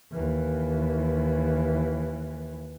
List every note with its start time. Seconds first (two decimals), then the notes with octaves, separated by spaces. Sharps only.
0.12 D#2 E3